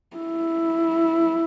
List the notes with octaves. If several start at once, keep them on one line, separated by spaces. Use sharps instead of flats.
E4